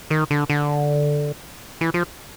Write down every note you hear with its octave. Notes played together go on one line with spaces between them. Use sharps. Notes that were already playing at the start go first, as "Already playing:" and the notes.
D#3
D3
D3
E3
F3